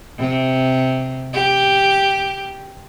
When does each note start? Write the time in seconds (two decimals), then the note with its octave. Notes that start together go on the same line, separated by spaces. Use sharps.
0.18 C3
1.33 G4